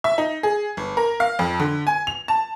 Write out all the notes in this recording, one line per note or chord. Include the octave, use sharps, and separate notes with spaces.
E5
D#4
G#4
G1
A#4
F5
F2
D3
G#5
F7
A5